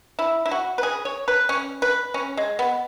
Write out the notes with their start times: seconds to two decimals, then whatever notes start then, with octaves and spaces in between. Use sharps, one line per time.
0.19 E4
0.46 E4
0.51 F#4
0.78 B4
0.83 G#4
1.05 C#5
1.28 B4
1.49 C#4
1.82 B4
2.14 C#4
2.37 G#3
2.59 B3